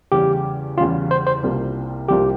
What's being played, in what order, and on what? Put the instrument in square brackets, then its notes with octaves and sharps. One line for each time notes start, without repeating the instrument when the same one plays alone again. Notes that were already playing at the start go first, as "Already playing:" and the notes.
[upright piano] E2 C#3 G3 C#4 [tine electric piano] G4
[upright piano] E2 C#3 G3 C#4 [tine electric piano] F4
[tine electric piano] C5
C5
[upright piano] C2 C3 G3 A#3 F4
[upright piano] C2 C3 G3 A#3 F4 [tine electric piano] G4